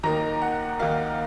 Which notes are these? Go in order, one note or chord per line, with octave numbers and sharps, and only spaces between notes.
D#2 D#3 A#3 D#4 A#5
F#5
D#2 D#3 A#3 D#4 F5